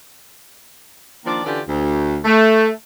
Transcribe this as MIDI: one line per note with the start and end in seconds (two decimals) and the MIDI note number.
1.25 1.43 51
1.25 1.43 53
1.25 1.43 58
1.25 1.43 62
1.25 1.43 74
1.45 1.60 50
1.45 1.60 52
1.45 1.60 61
1.45 1.60 65
1.45 1.60 67
1.45 1.60 74
1.68 2.19 38
2.24 2.69 57